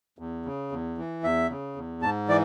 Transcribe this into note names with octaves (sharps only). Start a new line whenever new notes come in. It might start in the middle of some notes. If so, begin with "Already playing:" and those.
E2
C#3
E2
E3
E2 E5
C#3
E2
G#2 A5
E3 D5